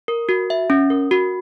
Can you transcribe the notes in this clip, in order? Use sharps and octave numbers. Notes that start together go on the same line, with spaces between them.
A#4
F#4
E5
C#4
A#4
F#4